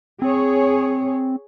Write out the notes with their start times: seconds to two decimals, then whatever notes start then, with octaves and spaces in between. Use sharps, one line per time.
0.22 C4 G#4 C#5